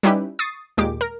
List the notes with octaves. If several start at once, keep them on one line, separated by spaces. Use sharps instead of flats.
G3 C#4 D#4 E4 G4 B4
C#6 D#6 A6 C7
D#2 A#2 G#3 G4 D6
A#4